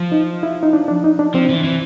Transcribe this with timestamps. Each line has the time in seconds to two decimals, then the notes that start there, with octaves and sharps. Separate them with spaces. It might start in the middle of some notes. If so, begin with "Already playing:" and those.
Already playing: F3
0.12 D#4
0.43 E4
0.63 D#4
0.73 D4
0.88 D4
1.04 D#4
1.19 D4
1.34 F3 C4
1.49 E3
1.64 E3